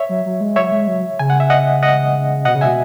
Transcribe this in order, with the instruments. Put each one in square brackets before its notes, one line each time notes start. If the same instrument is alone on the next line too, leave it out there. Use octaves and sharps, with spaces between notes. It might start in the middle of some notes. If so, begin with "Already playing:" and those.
Already playing: [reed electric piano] C#5 E5
[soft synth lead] F#3
F#3
G#3
[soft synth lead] F#3 [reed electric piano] C#5 E5
[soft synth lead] G#3
F#3
[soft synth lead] C#3 [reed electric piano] G#5
[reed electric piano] F#5
E5
D#5 F#5
D#5 F#5
[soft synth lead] B2 [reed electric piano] D#5 F#5
[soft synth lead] C#3
[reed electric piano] E5 G#5
[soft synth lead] B2